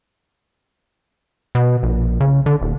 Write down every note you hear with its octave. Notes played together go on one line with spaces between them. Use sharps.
B2
A#1
C#3
D3
D#1